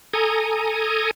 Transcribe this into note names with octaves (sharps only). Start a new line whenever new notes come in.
A4 G#5 A#5 D#6